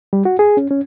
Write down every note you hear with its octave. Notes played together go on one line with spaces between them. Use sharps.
G3
F#4
G#4
C#4
C#4